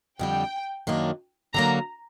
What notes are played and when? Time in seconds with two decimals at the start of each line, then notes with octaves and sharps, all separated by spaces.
0.19 F2 D3 G3 G5
0.87 F#2 D#3 F#3 A#3 D4
1.54 D3 F#3 A#3 A#5